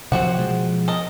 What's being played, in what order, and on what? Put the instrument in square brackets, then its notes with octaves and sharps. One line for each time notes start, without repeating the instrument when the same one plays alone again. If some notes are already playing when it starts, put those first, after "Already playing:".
[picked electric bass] C3 F3 F#3 [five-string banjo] C4 F#4 F#5
[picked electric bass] B2 F3 G#3
[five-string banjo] A4 A#4 D#5